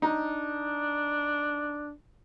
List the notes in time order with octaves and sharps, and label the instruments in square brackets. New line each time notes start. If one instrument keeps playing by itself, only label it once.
[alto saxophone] D4 [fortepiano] D#4